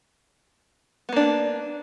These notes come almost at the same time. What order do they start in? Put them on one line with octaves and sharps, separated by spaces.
B3 A#3 D4